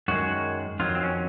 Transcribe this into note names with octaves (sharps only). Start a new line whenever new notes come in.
F#2 D#3 G#3 F#4
F2 D#3 F#3 F4
C4
C#4